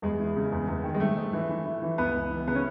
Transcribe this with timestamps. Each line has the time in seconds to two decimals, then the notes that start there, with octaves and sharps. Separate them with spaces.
0.02 E2 G#3
0.19 E3
0.36 C#3
0.52 E2
0.68 E2
0.84 D#3
0.94 G#3
1.00 G#2 A3
1.17 G#2
1.33 E3
1.49 E3
1.65 E3
1.82 E3
1.98 C#2 B3
2.15 C#2
2.31 E3
2.47 C#3 B3
2.55 C#4